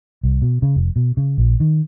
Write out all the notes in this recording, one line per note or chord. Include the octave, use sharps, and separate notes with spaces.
C2
B2
C#3
F1
B2
C#3
A#1
D#3